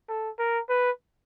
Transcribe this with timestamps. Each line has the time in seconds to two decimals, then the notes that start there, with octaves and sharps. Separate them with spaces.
0.09 A4
0.39 A#4
0.69 B4